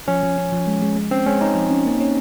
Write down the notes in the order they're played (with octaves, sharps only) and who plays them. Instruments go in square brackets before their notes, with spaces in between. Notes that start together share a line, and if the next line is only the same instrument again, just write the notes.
[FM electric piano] F3 [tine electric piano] C#4
[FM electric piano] F3
C#4
F3
G#3
G#3
G#3
[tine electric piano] C4 [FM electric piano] C#4
[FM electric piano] G#3 [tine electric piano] C#4
[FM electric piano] C#4 [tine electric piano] D#4
[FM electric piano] F3
C#4
A#3
C#4